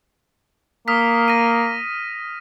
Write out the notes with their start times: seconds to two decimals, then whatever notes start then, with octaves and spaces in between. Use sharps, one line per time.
0.88 A#3 D#6 F6 B6
1.28 A#6 D#7